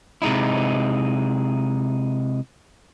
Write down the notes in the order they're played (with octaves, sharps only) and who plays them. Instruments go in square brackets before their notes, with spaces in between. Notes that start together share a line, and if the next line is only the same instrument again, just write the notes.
[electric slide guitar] C3 G#3 D#4 E4